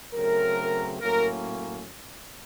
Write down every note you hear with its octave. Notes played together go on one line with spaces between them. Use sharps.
C#3 F#3 A3 C4 A#4
A2 F#3 A#3 C#4 A#4